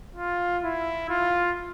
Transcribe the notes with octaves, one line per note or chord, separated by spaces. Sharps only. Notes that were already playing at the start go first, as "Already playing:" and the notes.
F4
E4
F4